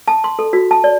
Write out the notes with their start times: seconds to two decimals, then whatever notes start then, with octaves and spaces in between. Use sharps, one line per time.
0.08 A5
0.24 C6
0.39 A4
0.53 F#4
0.71 A5
0.84 D5